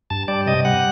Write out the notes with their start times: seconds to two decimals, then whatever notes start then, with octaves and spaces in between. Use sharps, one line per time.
0.10 G2 A5
0.28 G3 D5
0.46 C3 D#5
0.65 G3 F#5